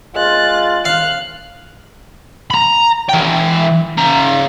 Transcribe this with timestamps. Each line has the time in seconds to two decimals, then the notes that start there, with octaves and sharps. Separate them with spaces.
0.15 G#3 F4 F#6 A6
0.85 F5 F6 F#6
2.51 A#5 B5
3.09 E3 G5
3.97 C#3 A#5